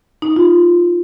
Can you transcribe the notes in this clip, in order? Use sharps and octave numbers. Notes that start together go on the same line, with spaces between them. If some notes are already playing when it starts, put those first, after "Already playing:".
D#4
F4